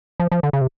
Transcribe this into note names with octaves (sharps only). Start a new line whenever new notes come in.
F3
F3
D3
C#3
C3